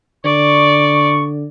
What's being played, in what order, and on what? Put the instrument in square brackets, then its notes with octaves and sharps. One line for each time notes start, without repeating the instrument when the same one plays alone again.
[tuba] D3 [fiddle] D5 [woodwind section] C#6